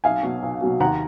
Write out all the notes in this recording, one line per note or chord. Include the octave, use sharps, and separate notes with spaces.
B1 F5 G#5
B2 F#3
B1
B2 F#3
D#2 F#5 A#5